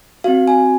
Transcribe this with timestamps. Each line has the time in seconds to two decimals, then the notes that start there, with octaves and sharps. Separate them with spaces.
0.24 C4 F#4 F5
0.48 G#5